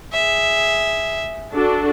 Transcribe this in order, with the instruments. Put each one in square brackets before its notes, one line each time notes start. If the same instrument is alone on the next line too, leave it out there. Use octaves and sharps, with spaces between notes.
[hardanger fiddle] G#4 E5
[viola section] D4 F#4 A4